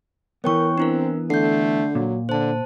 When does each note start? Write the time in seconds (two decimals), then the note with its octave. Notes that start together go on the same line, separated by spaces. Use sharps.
0.44 E3 B3 A#4 C#5 G5 C#6
0.78 C4 D4 E4 A#4
1.30 D3 A3 G6 C7
1.95 A#2 F#3
2.29 D3 C5 A5